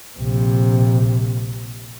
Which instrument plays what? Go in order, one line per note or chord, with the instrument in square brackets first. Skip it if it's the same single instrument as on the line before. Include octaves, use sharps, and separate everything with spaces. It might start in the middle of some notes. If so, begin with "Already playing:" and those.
[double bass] A#1 C3